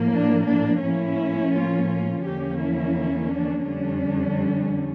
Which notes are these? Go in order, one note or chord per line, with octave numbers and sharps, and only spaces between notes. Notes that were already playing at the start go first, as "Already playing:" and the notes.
Already playing: A2 F3 A#3
D4
D4
A2 F3 A#3 C#4 E4
F4
F4
E2 D3 F3 A#3 C#4 G4
E4
D4
F2 D3 G3 C#4 D4